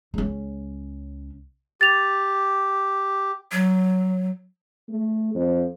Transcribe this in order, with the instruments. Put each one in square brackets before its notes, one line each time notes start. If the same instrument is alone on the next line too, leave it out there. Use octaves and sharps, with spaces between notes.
[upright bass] C#2 C#4
[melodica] G4 [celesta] A6 F7
[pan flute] F#3
[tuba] A3
F2